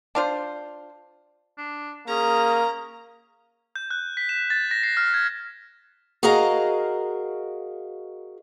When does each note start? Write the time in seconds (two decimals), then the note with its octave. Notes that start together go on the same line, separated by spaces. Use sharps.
0.15 D4 F4 C5
1.58 D4
2.08 A#3 C#4 G#4 A#5
3.76 G6
3.91 F#6
4.17 B6
4.29 E7
4.50 A6
4.71 A#6
4.83 C7
4.97 F6
5.14 G#6
6.23 F#4 G#4 A#4 D#5 F5 A#5